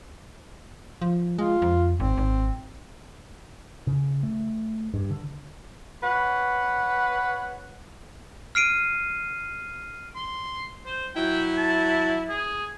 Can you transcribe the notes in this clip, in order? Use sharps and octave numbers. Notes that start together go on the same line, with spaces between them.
F3
G#3 F4
F2
G#1 C4
G#1
C#3
A3
G2
D3
B4 C#5 F#5
F6 C7 D7 D#7
C6
C5
F#3 E4 G5
A5
G#4